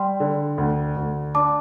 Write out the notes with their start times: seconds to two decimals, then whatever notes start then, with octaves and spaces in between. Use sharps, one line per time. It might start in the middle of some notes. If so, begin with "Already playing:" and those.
Already playing: G3 G5 C6
0.20 D3
0.58 D2
0.97 D2
1.35 D4 A5 D6